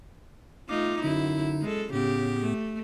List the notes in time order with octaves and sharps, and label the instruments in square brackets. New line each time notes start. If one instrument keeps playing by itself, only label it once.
[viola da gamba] A3 D#4 F4 [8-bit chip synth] D6
[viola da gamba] F#2 E4 [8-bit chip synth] D3 D#4
[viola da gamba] G#3 A4
[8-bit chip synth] A2 B3 [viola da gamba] C#3 G4
[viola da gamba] A3